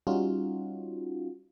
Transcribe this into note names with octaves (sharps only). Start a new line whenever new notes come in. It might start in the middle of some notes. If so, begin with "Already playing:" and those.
G3 C#4 D#4 F4 F#4